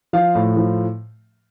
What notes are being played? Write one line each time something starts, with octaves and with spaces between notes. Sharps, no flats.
F3 F5
A2
F3